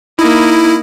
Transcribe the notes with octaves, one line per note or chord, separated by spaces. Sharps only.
A#3 D#4 E4